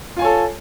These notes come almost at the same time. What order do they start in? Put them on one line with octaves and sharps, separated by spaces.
F4 G#5 C#5 A4